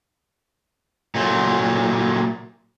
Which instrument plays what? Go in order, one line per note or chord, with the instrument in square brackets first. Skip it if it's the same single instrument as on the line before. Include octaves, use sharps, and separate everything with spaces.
[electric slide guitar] A#2 F#3 A3